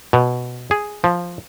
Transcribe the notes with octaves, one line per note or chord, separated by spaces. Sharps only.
B2
G#4
F3